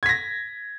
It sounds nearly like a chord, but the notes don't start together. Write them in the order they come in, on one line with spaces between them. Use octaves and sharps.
G#6 B6 A#6